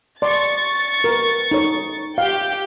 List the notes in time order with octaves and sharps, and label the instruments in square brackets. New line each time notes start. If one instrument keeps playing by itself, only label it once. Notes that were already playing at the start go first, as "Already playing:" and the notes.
[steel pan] D5 C6 [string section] C#6 A6
[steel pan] A#4 B4
D#4 A4 C#5
[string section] G4 G5 [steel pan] F5